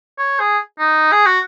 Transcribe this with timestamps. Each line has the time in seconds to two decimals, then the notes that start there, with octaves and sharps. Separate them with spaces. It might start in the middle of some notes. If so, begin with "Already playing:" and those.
0.18 C#5
0.40 G#4
0.79 D#4
1.12 G#4
1.26 F#4